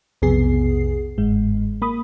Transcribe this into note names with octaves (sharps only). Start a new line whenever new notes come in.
B1 F2 C3 B3 G#4 C7
G1 G#2 G#3
A#3 B5 D#6